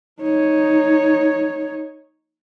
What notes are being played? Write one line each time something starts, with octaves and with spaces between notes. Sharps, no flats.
D#4 C#5